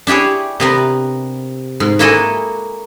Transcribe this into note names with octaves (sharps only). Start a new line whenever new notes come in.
D4 E4 G4 G#4 C#5
C3 B3 A#4
G#2
A#3 E4 F#4 A4 D#5 G#5